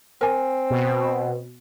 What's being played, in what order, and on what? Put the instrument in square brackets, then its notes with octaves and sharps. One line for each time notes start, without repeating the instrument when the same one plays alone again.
[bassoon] C4 [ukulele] A#4 G#5
[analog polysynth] B2